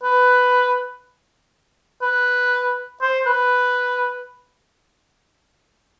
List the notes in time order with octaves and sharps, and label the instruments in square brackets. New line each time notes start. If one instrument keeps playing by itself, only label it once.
[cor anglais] B4
B4
C5
B4